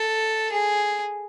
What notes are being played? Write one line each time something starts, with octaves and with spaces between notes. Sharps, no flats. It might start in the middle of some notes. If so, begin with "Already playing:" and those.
Already playing: A4
G#4